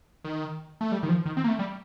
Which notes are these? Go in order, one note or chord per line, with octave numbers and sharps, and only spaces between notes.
D#3
A3
G3
D#3
F3
D#3
C4
A#3
A3
G3